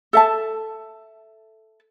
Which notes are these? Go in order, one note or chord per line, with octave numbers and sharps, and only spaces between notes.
A4 E5 A5